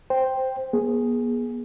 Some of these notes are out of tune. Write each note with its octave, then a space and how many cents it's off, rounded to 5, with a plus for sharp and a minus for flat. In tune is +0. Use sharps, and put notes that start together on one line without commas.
C5 +5 G5 +0
B3 -45 G#4 +0